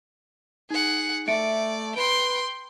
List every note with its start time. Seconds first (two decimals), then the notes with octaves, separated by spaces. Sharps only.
0.70 D#4 G#4 F#5
1.28 A3 D5 E5 C#7 D7
1.96 B4 G5 C6 D7